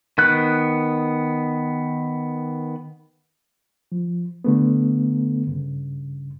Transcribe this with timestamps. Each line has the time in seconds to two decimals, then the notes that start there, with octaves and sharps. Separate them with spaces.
0.18 D#3 B3 F#6
3.92 F3
4.44 D3 A3 B3
5.47 G2 C#3